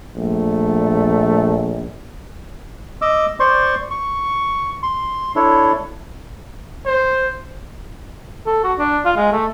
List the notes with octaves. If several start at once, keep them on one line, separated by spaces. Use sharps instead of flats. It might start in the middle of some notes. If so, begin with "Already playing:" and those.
A#1 A3
D#5 D6 E6
C5 D5 C6 C#6
C#6
C6
D4 E4 A4 C#5
C5
A4
F#4
D4
F4
G#3
A3